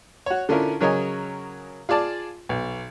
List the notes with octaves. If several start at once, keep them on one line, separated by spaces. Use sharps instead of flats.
F#4 C#5
D3 C#4 E4 F4 A#4
C#3 F#3 A#4 C#5 D#5 G#5
F4 G#4 D5 A5 D6
B1